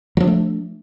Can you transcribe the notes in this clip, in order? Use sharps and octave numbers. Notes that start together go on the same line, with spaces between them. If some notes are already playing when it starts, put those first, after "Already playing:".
F3 F#3 A3 D4